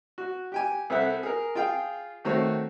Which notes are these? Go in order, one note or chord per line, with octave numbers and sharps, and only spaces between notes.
F#4
G4 G5 G#5
C2 C4 A4 E5 F#5
G#4 A#4
F4 G#4 G5
D#3 A3 C4 F#4 C#5